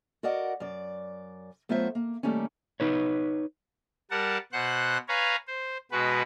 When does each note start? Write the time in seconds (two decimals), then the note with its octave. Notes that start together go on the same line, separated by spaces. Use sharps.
0.23 F#4 A#4 D5 D#5 F#5
0.60 F#2 D5
1.69 F#3 A3 B3 F4 C5 E5
1.95 A#3
2.23 D#3 G3 A3 A#3 C#4
2.80 D#4 B4 C#5
4.11 G3 A#4 F#5 A5
4.52 B2 C5 F#5 F#6
5.08 B4 C#5 F5 G#5 A#5
5.47 C5
5.91 B2 G#3 F#4 B4